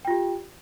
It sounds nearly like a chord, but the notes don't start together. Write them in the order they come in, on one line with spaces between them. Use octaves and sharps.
G5 F4 G4